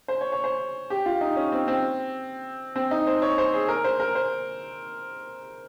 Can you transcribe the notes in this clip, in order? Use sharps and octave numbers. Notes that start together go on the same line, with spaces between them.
C5
C#5
C#5
C5
G4
F4
D#4
C#4
C4
C4
C4
D#4
C5
C#5
C5
G#4
A#4
C5
A#4
C5